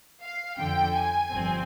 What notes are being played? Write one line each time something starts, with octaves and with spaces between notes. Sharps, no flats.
F5
F2 D3 F3 G5
G#5
G1 G2 F3 C4